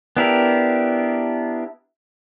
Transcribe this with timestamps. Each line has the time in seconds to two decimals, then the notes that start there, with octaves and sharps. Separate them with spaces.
0.17 B3 D4 E4 G4 A#4